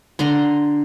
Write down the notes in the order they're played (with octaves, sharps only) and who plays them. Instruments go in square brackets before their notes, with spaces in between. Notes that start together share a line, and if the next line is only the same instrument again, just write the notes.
[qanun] D3 A#5 C6